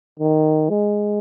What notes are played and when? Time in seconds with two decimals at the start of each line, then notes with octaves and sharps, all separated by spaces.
0.20 D#3
0.70 G#3